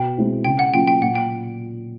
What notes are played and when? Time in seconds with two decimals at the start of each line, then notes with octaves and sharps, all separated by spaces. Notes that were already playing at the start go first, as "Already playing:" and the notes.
Already playing: B2 G5
0.17 G#3 C4 E4
0.44 C#3 G5
0.59 F#5
0.73 F#3 A#3 C#4 F4 G5
0.88 G5
1.02 A#2 F#5
1.15 G5